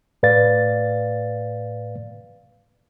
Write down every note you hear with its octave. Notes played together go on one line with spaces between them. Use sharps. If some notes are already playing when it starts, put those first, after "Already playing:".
A2 B4 D5 F5 A6